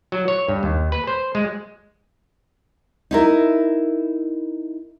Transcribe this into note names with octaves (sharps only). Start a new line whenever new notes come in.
F#3
C#5
G2
D#2
B4
C5
G#3
D#4 E4 A#4